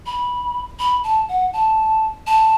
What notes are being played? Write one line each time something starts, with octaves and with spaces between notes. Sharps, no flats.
B5
B5
A5
F#5
A5
A5